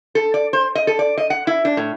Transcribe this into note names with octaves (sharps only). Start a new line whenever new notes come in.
A4
D5
C5
D#5
A4
D5
D#5
F#5
E4
D4
A2